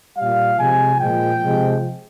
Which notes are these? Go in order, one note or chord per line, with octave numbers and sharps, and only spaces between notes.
A#2 G3 F5
C3 F3 G#3 G#5
A#2 F3 G#3 G5
C3 F3 G#3